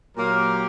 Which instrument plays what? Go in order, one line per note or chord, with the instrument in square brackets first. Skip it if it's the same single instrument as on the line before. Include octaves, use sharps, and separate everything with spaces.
[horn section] A#2 F#3 A#3 G4 A#4